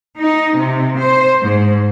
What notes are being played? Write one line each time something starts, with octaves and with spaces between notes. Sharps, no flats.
D#4
C3
C5
G#2